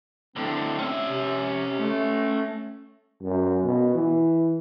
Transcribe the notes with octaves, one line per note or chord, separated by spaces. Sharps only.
A2 D3 C4
C#4 E5
C3
A3
F#2
B2
E3